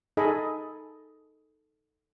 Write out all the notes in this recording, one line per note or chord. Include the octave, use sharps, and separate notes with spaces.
D#4 G#4 A4 D#5 G#5 B5